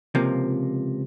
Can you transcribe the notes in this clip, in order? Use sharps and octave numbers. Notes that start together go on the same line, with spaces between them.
C#2 C3 F3 A#3